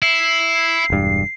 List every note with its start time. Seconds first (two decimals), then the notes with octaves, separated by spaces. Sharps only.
0.02 E4 C7
0.90 E1 G2